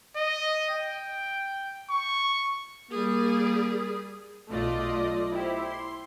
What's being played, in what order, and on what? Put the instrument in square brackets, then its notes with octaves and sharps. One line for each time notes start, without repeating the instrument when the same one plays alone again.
[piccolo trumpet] D#5
G5
C#6
[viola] G3 G#4 [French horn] A#3
[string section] B1 A3 F4 D5 D#5
E4 G4 C5
C6